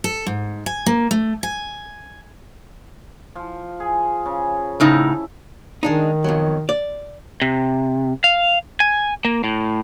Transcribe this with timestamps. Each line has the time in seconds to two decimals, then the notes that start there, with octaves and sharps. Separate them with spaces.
0.04 A4
0.26 G#2
0.66 G#5
0.86 A#3
1.11 A3
1.43 G#5
3.36 F3
3.80 G#4
4.26 C#3
4.80 A2 C#3 D#4 E4 E5 A5
5.83 D#3 G#3 D4 D#4
6.24 F2 B2 F#3
6.69 D5
7.42 C3
8.24 F5
8.80 G#5
9.25 A#3
9.44 A2